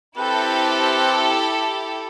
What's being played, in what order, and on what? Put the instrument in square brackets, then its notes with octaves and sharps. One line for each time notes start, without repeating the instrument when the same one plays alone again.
[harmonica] C4 B4 [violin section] E4 G4 A4